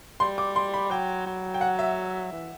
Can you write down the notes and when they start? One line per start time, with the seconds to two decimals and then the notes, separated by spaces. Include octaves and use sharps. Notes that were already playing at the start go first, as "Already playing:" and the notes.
0.20 G3 C6
0.38 D6
0.56 C6
0.74 B5
0.91 F#3 G5
1.26 F#3
1.54 G5
1.61 F#5
1.79 E5
2.32 E3